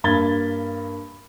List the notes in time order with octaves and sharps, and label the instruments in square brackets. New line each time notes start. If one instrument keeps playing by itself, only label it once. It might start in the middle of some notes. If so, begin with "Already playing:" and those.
[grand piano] G2 A#3 B5 G#6 A6 G7